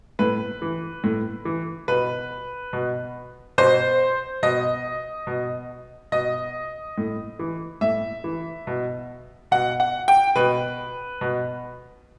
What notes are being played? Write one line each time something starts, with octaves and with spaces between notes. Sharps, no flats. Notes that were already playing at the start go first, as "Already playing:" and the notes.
A2 B4
E3
A2
E3
B2 B4
B2
B2 C5
B2 D#5
B2
B2 D#5
A2
E3
A2 E5
E3
B2
B2 F#5
F#5
G5
B2 B4
B2